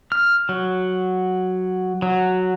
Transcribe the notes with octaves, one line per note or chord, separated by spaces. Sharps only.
F6
F#3
F#3